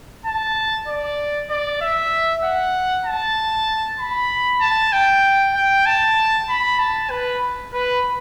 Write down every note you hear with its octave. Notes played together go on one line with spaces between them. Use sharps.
A5
D5
D5
E5
F#5
A5
B5
A5
G5
G5
A5
B5
A5
B4
B4